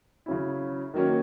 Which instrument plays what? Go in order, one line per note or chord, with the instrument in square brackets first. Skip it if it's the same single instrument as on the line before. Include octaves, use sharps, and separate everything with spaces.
[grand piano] C#3 F#3 C#4 E4
D#3 F#3 A#3 C#4